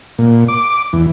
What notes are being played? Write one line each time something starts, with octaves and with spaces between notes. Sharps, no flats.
A#2
D6
E2